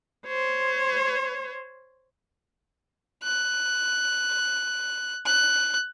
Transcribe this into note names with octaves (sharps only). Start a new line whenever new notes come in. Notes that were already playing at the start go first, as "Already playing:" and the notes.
C5 C#5
F#6
F#6